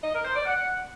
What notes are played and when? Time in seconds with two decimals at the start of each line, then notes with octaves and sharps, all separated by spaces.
0.03 D#5
0.14 A#4
0.24 C5
0.35 D5
0.46 F#5